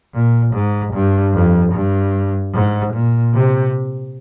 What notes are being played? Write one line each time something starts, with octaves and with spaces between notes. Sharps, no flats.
A#2
G#2
G2
F2
G2
G#2
A#2
C3